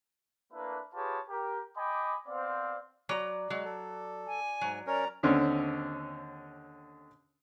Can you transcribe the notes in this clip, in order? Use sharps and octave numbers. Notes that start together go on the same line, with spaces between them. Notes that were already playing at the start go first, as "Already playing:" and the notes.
A3 A#3 D4 E4 B4
F4 G4 G#4 B4 C#5 A5
G4 A#4
D#5 G5 G#5 B5 D6
B3 C4 C5 D5 F5
F#3 D5 A#5
F#3 G#3
A4
G#5
G#2 F#3
C#4 A#4 C#5 D5 A#5
D#2 D3 C4 C#4